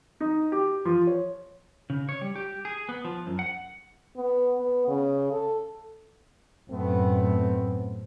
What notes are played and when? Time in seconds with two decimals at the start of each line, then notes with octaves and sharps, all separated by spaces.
0.20 D#4
0.52 G4
0.85 F3
1.07 C#5
1.90 C#3
2.09 C#5
2.21 G3
2.36 G4
2.65 G#4
2.89 B3
3.05 F3
3.27 F#2
3.39 F#5
4.17 B3
4.59 B3
4.88 C#3
5.32 A4
6.71 F#2 A2 A3 B3 C4